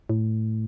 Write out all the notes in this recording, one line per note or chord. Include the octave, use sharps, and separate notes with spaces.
A2